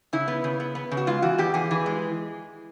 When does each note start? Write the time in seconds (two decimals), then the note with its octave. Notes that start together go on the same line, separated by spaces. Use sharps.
0.13 C#3 E4
0.28 B3
0.44 C#3
0.60 B3
0.75 B3
0.91 C#3
0.97 F#4
1.07 G#3 F4
1.22 E3 F#4
1.38 E2 G4
1.54 E2 G#4
1.71 E3
1.86 G#3